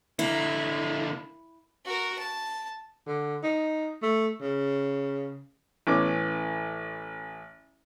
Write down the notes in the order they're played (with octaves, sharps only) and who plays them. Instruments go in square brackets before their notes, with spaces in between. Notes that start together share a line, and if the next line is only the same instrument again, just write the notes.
[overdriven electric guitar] D3 A#3 [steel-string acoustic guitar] E4
[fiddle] F#4 A#4
A5
[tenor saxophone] D3
D#4
A3
C#3
[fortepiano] A1 E3 C#4 D6